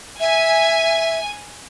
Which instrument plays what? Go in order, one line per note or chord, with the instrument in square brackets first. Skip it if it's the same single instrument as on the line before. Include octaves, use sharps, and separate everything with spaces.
[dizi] E5 [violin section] G#5